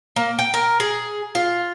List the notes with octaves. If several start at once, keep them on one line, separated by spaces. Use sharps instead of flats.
A#3
G5
A#4
G#4
F4